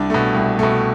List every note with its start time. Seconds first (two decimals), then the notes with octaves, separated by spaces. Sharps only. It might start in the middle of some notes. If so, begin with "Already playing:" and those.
Already playing: C2 D4 D5
0.10 B2 A3
0.35 C2
0.59 B2 A3